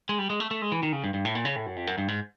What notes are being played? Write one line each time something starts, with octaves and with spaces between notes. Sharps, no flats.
G#3
G3
G#3
A3
A3
G#3
E3
D#3
C#3
G2
G2
A2
A#2
C#3
A2
F#2
F2
F#2
G2
G#2